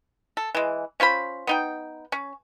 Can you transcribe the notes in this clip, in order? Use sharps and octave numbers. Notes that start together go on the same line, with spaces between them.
A4
E3 G#3
C#4 F4 C5 B5
B3 D#4 G5
C#4